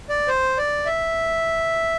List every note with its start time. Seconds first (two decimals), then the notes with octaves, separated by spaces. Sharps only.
0.09 D5
0.28 C5
0.58 D5
0.86 E5